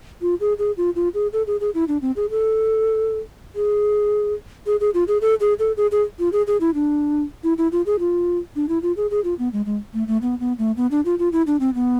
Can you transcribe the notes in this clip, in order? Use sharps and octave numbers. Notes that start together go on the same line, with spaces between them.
F4
G#4
G#4
F4
F4
G#4
A4
G#4
G#4
E4
D4
C4
G#4
A4
G#4
G#4
G#4
F4
G#4
A4
G#4
A4
G#4
G#4
F4
G#4
G#4
E4
D4
E4
E4
F4
G#4
F4
D4
E4
F4
G#4
G#4
F4
B3
G#3
G#3
A3
A3
B3
B3
A3
B3
D4
F4
F4
E4
D4
C4
B3